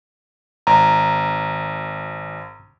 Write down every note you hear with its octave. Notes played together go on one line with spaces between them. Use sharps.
G#1 A#5